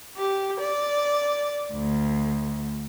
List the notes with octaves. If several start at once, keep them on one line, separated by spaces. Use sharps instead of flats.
G4
D5
D2